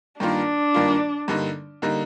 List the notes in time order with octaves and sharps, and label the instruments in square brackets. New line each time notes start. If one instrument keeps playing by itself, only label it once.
[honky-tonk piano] G2 D#3 A#3 F4 [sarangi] D4
[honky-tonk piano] G2 D#3 A#3 F4
G2 D3 G3 A#3 D#4
D3 G3 A#3 D#4